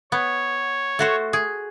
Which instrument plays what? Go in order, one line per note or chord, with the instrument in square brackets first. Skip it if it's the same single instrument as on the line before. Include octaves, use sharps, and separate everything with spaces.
[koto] B3 [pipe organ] C#5
[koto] A3 F#4 C5
G#4